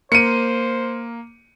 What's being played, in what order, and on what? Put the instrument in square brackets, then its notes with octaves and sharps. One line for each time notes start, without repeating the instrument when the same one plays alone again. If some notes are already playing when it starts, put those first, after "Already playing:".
[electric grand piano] A#3 [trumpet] C5 [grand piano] C#7 D#7